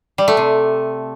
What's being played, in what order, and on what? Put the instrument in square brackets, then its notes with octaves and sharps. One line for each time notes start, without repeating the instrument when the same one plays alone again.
[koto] G3
A3
C3